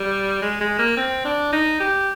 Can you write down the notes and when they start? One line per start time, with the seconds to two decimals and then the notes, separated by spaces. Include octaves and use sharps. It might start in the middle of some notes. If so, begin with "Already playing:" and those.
Already playing: G3
0.42 G#3
0.61 G#3
0.79 A#3
0.97 C4
1.25 D4
1.52 D#4
1.80 G4